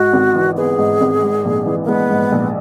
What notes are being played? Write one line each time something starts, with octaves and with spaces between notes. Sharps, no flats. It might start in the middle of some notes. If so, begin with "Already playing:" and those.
Already playing: G#2 F#4
G#1
E3
B3 G#4
G#2
G#1
G#2
A#1
E3
A#3
G#3 B3
G#2
A#1